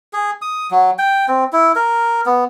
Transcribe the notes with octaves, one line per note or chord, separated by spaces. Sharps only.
G#4
D#6
F#3
G5
C4
E4
A#4
B3